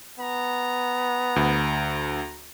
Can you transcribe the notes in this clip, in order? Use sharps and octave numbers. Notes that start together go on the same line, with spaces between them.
B3 A#5
D2